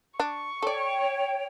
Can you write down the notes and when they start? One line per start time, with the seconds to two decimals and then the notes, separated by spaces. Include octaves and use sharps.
0.20 D4 C#6
0.63 A4 C#5 D5 G5